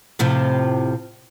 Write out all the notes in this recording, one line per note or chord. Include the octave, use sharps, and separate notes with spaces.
A2 C3 F3